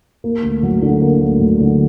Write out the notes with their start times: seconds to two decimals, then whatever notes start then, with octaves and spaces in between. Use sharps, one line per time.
0.24 A#3
0.43 D2
0.63 F#3
0.82 D3
1.02 A#3
1.21 D2
1.40 F#3
1.60 D3